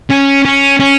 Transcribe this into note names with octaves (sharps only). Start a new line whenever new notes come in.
C#4
C#4
C#4